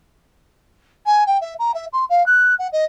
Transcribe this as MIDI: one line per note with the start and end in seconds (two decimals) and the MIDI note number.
1.06 1.26 80
1.27 1.38 79
1.41 1.54 76
1.59 1.74 82
1.74 1.85 76
1.93 2.05 84
2.09 2.25 77
2.26 2.55 90
2.59 2.67 78
2.72 2.85 75